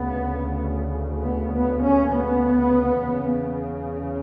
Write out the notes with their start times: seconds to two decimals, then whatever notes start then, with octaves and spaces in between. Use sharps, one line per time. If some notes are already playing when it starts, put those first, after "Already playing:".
Already playing: D2 C#3 B3
1.23 B3
1.54 B3
1.83 C#4
2.13 B3
3.03 E2 C#3